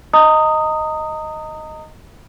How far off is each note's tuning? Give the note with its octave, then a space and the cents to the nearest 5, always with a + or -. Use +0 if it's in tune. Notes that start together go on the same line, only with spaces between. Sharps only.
D#5 +0 A#5 -30 D#6 +0